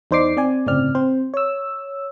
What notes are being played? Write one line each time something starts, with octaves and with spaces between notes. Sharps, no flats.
E2 D#4 C5 D5 D6 C7
C4 D5 G#5
G1 A2 C#3 C4 D5 F6
C4 C5
C#5 E6